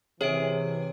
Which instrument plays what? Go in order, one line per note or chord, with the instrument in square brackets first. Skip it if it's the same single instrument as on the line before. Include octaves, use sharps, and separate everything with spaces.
[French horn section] C3 E3 [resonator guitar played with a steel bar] G#4 [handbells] C#5 E5 D7